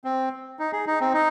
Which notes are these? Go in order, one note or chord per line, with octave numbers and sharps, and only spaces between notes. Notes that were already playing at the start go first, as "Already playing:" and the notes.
C4
D#4
G#4
D#4
C4
D#4